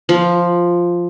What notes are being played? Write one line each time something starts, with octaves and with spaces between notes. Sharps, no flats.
F3